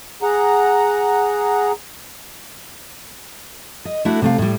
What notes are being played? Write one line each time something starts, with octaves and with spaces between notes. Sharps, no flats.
G#4 F#5 A#5
D#5
A3 D4 E4 F#4
C3 A3 F5
A2 G3